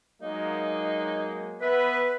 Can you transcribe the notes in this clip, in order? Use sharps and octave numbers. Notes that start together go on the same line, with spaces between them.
F#3 G#3 A#3 D#4
B3 B4 E5